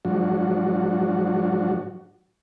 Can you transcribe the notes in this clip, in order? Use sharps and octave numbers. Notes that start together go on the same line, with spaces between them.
G#2 F3 F#3 D4 F#4